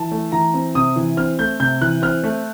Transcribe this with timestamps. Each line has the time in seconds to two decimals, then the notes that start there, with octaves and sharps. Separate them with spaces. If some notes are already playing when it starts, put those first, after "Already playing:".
Already playing: E3 A5
0.12 A3
0.32 E3 A#5
0.54 C4
0.75 C3 D#6
0.96 E3
1.17 C4 F6
1.39 A3 G6
1.60 C3 G6
1.81 E3 F#6
2.02 C4 F6
2.24 A3